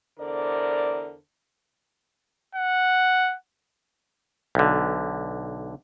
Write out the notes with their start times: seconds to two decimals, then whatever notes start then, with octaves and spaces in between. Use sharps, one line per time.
0.19 E2 D3 A#4 C5 D5
2.55 F#5
4.55 B1 D3